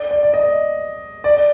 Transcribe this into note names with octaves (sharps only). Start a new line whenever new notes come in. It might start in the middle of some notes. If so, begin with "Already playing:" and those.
Already playing: D5
D5
D5
D#5
D5